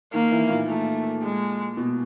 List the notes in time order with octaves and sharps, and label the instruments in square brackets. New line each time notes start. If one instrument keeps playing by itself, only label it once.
[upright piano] D#3 [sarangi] A#3
[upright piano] E3
A#2
[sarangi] A3
G#3
[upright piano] B2